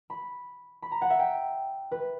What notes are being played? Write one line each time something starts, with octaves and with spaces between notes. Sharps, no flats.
B5
B5
A#5
F#5
E5
G5
B4